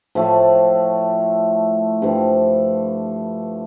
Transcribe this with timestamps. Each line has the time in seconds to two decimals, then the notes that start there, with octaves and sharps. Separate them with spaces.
0.15 A2 F3 A3
2.02 G2 D3 F3 A3